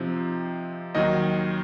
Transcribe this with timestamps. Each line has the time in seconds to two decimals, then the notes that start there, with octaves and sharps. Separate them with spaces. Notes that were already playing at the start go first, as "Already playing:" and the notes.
Already playing: C3 F3 C4 D#4
0.95 D#2 D#3 F#3 D#5